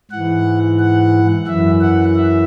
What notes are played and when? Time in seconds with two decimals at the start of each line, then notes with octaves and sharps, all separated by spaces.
0.11 G#2 E3 F#5
0.80 F#5
1.47 F#2 E3 E5
1.81 F#5
2.16 E5